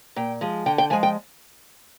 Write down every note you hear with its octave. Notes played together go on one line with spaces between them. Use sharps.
A#2 G5
F3 G#3
D3 G5
G5
F3 G#3 G#5
G5